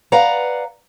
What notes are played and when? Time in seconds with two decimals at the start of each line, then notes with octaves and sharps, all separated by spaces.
0.12 B4 D5 F5 F#5 A#5